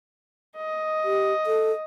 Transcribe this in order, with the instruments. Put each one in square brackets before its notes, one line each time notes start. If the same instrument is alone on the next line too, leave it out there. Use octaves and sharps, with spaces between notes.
[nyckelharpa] D#5
[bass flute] G4
A4